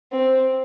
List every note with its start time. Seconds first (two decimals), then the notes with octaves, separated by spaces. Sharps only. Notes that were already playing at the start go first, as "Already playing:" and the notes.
0.12 C4